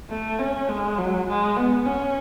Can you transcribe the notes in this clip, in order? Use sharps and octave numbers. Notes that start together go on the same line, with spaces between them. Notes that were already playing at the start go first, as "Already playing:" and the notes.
A3
C#4
G#3
F#3
G#3
B3
C#4